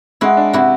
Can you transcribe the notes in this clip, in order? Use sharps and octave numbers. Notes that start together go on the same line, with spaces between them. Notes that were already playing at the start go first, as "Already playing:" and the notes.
G#3 E4 F#4
D4
C3 E4 F#4